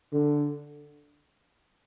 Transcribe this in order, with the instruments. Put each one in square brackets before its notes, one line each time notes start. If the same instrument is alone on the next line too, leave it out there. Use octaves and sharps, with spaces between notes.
[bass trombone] D3